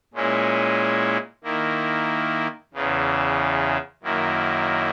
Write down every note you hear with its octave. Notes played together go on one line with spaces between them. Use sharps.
A#2 G#3 C#4 E4
D#3 A#3 E4
E2 C#3 E3
F#2 D#3 A#3 E4